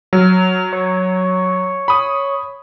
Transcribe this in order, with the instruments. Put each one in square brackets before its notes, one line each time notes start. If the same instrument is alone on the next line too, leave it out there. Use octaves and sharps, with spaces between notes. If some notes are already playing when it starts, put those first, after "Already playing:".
[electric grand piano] F#3 [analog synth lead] F6
[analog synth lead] C#5
[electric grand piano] B5 D#6